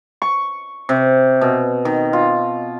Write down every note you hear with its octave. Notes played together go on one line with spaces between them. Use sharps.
C#6
C3
B2
D#3
F4